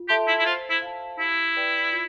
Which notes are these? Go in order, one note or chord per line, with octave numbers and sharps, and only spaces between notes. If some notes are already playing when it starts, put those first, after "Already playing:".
Already playing: F4
G4 A4 E5 A5 C6
E4
E4
F4 C5
E4
F5 A5
E4 G4
B4 D5 G5
F4